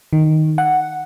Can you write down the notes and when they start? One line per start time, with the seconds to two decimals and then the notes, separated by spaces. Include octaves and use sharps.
0.13 D#3
0.58 F#5